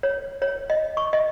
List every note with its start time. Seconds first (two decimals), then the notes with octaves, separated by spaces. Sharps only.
0.03 C#5
0.42 C#5
0.70 D#5
0.97 C#6
1.13 D#5